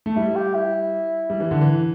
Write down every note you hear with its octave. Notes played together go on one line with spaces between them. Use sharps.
A3
G3 E4
G4
E4
G3
E3
D3
E3